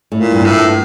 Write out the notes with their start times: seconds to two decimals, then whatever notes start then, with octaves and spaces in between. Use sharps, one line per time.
0.12 A2
0.18 A#2
0.32 G2
0.45 A2
0.52 G2